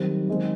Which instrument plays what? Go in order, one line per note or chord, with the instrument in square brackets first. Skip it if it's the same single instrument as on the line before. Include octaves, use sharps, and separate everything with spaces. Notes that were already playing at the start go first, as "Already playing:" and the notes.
Already playing: [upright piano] D#3 G3 C4 [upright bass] F#3
[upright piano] D#3 G#3 C4